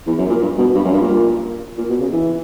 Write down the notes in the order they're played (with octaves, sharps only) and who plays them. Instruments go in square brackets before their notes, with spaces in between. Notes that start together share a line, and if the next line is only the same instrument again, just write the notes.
[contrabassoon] E2
F#2
A#2
G2
B2
G2
F#2
G2
A#2
A#2
B2
C#3
E3